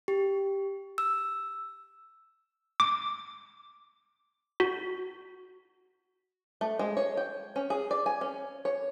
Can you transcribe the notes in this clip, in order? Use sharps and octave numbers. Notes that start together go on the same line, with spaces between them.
G4
E6
D6
F#4
A3
G#3
C#5
G5
C#4
G#4
D5
G#5
C#4
C#5